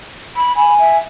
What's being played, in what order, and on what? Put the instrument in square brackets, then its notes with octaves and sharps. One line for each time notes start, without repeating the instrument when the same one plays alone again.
[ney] B5
[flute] G#5 [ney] B5
[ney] E5